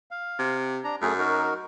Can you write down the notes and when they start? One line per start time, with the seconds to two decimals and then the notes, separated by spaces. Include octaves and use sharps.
0.11 F5
0.39 C3
0.84 D4 A#5
1.02 F#2 A3 G#4
1.18 D#4 F#4 A#4